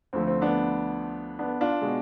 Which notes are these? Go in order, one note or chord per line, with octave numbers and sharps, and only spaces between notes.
D2 D3 F3 A3 C4
C4
B3 D4
B3 D4
D4 F4
B2 G#3